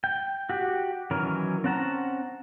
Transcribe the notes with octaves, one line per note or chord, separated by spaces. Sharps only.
G5
F#4 G4
D#3 E3 F#3 C#4 A#4
C4 C#4 F#5 A5 A#5